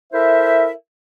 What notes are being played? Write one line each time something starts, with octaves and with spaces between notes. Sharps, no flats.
E4 A4 A#4 C5 E5